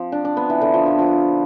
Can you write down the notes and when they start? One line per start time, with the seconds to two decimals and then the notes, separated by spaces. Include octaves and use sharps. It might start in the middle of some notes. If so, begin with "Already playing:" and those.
Already playing: F3 C4
0.12 D4
0.25 D4
0.37 B3
0.50 E3
0.61 D3
0.74 F3
0.86 F3
0.99 F3